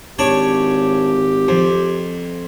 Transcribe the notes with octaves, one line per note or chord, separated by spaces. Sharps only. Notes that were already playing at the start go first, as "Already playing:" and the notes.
G#1 D4 G4 C#5
F2